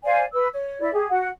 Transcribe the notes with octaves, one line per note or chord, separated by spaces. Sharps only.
C5 D5 F5 G#5
B4 E6
C#5
E4 D5 E5
G4 G#4
F#4 F#5